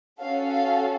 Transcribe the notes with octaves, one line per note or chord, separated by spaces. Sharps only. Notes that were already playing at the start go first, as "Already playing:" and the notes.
C#4 F#4 A4 F5
F5